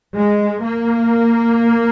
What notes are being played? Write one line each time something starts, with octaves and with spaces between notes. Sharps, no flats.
G#3
A#3